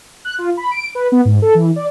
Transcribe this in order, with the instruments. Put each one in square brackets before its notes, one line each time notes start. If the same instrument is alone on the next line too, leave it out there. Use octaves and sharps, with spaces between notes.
[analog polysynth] F#6
F4
B5
D7
B4
B3
G#2
A4
E3
D5